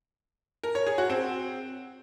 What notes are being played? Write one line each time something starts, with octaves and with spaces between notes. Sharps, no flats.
A#4
C#5
G#4
F#4
C4